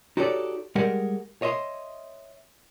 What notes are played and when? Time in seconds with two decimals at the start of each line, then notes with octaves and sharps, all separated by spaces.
0.17 D#4 F#4 G4 A4 C#5 D5
0.75 G3 G#3 G4 A#4 F#5
1.42 C#5 D#5 E5 C6